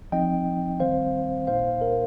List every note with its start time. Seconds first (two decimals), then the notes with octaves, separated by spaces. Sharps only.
0.12 F3 C4 D#4 D#5 G5
0.80 D#3 G3 C4 C5 F5
1.47 A#2 A#3 D#4 C5 F5
1.81 A#4